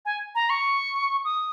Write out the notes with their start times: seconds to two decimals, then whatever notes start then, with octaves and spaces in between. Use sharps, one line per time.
0.05 G#5
0.35 A#5
0.50 C#6
1.25 D#6